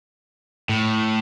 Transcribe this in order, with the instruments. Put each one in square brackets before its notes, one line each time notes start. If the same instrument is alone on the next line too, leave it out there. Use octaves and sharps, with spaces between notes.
[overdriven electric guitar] A2